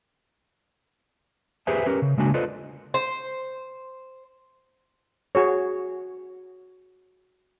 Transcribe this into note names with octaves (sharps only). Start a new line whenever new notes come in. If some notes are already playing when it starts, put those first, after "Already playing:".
G4 G#4 B4 C5 E5 G#5
C#4 G4 A#4 B4
C#3
C#3 G#3 A#3 D4 F#4 G#5
F4 A4 B4 C5 D5 D#5
C5
F#4 G#4 C#5